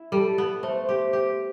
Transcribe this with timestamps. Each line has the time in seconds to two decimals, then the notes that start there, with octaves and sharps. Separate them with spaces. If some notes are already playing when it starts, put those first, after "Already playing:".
Already playing: E4
0.12 G3 A4
0.38 B3
0.63 A3 C5
0.89 G4
1.13 G4